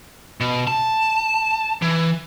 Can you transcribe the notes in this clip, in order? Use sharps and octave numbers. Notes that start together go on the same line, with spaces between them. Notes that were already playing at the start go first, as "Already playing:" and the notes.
B2
A5
E3